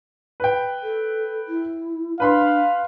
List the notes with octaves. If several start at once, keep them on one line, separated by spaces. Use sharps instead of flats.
B4 G5
A4
E4
D4 B4 F5 B5 C6